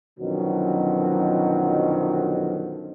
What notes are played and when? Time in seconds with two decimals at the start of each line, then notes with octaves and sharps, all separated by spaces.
0.19 F#2 B2 D3 D#3 F3 F#3